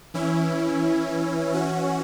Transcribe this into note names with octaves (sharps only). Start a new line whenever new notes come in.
E3 C#4 E4
E3 C#4 F#4